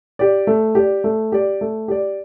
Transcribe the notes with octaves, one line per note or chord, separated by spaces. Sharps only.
G4 D5
A3
G4 D5
A3
G4 D5
A3
G4 D5